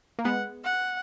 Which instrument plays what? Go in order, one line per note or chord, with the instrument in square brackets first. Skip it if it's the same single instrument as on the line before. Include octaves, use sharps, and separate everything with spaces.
[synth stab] A#3
[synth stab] G#3 B3 [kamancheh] F#5
[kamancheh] F#5